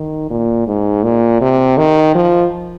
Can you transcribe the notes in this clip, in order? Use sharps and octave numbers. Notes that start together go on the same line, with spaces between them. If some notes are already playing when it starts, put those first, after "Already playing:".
Already playing: D#3
A#2
G#2
A#2
C3
D#3
F3